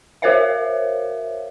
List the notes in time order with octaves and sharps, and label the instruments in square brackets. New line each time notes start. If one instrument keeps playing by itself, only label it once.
[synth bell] F#4 A#4 C5 C#5 E5 F5